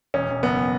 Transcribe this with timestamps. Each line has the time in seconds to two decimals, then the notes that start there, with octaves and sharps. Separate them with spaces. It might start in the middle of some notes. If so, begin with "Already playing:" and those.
0.14 E1 C#4
0.29 E1
0.43 F#1 B3